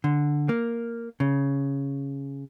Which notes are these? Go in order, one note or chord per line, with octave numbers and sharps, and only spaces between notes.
D3
A#3
C#3